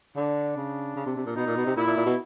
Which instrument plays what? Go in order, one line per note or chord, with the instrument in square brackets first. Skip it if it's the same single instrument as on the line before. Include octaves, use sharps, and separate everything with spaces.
[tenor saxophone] D3 [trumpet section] D4
[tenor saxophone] C#3
C#3
C3
C3
A#2
[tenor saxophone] B2 [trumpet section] D#4
[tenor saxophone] A#2
B2
C3
[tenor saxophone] A#2 [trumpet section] E4
[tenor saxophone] A#2
A#2
B2